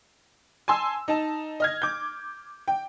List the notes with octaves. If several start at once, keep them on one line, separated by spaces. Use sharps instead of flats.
G#5 A5 C6 E6
D#4 A5
D#5 F6 G#6
D6 G6
G5